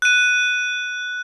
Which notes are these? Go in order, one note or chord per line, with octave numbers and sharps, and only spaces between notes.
F#6 D#7